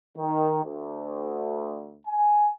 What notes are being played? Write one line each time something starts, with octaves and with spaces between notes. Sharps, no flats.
D#3
D2
G#5